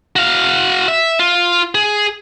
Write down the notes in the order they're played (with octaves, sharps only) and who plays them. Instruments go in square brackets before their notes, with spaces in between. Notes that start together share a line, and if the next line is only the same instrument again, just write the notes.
[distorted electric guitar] F#4 F5
E5
F4
G#4